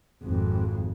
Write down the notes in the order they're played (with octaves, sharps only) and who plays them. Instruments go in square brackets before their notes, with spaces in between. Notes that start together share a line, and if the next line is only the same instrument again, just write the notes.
[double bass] G#1 F2